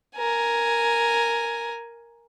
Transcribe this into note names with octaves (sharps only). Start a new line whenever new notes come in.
A#4 G#5